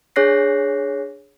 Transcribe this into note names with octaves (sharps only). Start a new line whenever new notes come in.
D4 G#4 C#5 F#6 A#6 C7